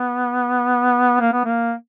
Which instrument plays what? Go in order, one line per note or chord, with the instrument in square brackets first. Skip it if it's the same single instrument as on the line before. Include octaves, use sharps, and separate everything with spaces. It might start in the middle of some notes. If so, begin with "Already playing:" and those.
Already playing: [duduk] B3
A#3
B3
A#3